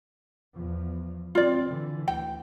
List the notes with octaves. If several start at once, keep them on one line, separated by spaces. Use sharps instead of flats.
E2 F3
C4 F4 D5
D3 E3
D2 G5